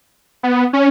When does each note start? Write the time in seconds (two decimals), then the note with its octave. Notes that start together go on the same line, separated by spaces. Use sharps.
0.43 B3
0.73 C#4